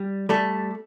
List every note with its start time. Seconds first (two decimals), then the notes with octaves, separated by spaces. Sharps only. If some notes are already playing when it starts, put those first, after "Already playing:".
Already playing: G3
0.29 G3 A3 A4